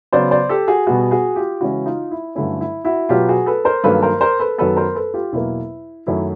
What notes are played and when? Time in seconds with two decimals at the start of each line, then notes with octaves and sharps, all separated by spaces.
0.12 C#3 F#3 B3 C5 D5
0.31 C5 D5
0.49 G4 A4
0.68 F#4 G#4
0.87 B2 G3 B3 F#4 G#4
1.11 F#4 G#4
1.36 F4 G4
1.61 C#3 E3 G#3 C#4 E4 F#4
1.86 D#4 F4
2.11 E4
2.35 G2 D3 F#3 A3 C#4 E4
2.61 E4
2.85 E4 F#4
3.09 B2 F#3 B3 F4 G4
3.28 F#4 G#4
3.46 A4 B4
3.65 A#4 C5
3.84 G2 D#3 F#3 A#3 A4 B4
4.02 A#4 C5
4.21 A#4 C5
4.39 A4 B4
4.58 F#2 D#3 F#3 B3 A4 B4
4.76 A#4 C5
4.95 A4 B4
5.14 F4 G4
5.33 E2 B2 F#3 A#3 E4
6.07 F#2 D#3 F#3 A3 E4